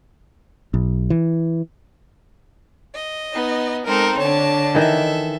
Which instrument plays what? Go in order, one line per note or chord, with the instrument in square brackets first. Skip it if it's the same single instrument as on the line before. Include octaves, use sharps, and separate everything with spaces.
[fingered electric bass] B1
E3
[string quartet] D#5
[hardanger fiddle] B3 D#4
[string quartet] G#3 C4 D#4 [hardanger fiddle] A4 A#4
[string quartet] D3 D4 [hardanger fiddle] C#5 A5
[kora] D#3 E3 [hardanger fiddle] A4 E5